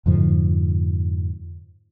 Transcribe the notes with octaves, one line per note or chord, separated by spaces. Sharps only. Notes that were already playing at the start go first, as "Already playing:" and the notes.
F2 G#2 D3 F3